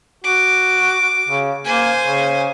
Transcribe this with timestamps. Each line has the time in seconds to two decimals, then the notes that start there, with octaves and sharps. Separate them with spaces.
0.24 F#4 D6
1.28 C#3
1.65 A#3 C5 G#5
2.07 C#3